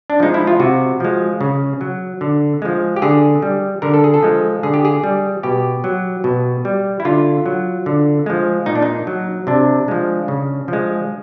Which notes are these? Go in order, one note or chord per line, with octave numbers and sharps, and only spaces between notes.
D4
F3 G#3 D#4
E4
F4
C3 F#4
F3 G#3
C#3
F#3
D3
F3 G#3
G4
D3 G#4
G3
D3 A#4
A4
G#4
A4
F3 G#3
D3 G#4
G4
G#4
G3
B2 G4
F#3
B2
G3
E4
D3 F4
F#3
D3
F3 G#3
A#2 D#4
D4
D#4
F#3
C3 D4
F3 G#3
C#3
F3 G#3